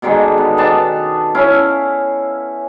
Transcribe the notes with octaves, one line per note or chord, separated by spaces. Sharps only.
B2 D3 D#3 G#3
B3
D#3 B3 D4 A5
C#4 E4 F5